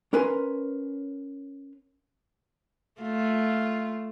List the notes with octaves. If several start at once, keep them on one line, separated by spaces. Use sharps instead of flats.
C#4 A#4 B4 G#5 C6
A3 F4